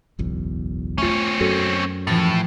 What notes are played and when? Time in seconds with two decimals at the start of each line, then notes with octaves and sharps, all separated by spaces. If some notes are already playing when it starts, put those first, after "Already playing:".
0.19 F#1 B1 E2
0.98 A3 C4 C#4 F4
1.41 F#2 F#4 A4
2.07 A2 E3 F3 A6